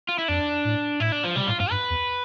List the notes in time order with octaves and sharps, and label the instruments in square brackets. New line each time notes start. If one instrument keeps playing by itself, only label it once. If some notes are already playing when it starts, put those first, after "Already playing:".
[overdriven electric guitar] F4
E4
[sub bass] F2 [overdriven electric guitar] D4
[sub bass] A2
[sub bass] A2 [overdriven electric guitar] E4
[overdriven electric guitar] D4
F3
[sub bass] C3 [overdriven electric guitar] G3
[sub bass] A2 [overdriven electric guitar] F4
[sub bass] G2 [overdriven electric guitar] F4
[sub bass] G2 [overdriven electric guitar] B4
[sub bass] E2